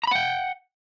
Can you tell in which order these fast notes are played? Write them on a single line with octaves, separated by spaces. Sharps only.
A#5 B5 F#5 G5